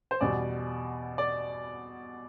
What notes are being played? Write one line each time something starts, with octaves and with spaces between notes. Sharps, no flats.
C5
E2 B2 G3 D5
D5